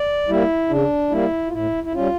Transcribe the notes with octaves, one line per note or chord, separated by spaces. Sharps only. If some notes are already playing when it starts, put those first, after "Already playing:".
Already playing: D5
G3 A#3 E4
C#3 D4
G3 A#3 E4
F4
A2 E4
E4
G3 C#4 F4